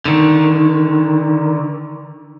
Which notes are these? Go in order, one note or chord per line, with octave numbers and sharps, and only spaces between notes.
D3 D#3